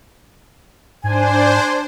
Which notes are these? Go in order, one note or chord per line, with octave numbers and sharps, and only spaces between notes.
G#2 D4 C5 G#5